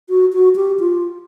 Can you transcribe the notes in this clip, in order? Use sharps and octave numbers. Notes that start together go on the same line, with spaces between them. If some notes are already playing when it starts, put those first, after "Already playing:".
F#4
F#4
G4
F4